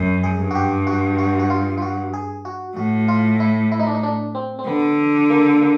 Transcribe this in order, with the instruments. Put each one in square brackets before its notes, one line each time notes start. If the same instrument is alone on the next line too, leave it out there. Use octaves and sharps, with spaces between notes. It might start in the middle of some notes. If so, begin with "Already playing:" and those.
Already playing: [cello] F#2
[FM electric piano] G#4
[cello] G2
[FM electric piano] F#4
G4
F#4
F#4
F#4
F4
F4
F#4
G#4
F#4
[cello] A2 [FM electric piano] F#4
[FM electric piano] F4
E4
E4
D#4
D4
D#4
D4
C4
C4
[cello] D3 [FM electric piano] B3
[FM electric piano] A#3
A#3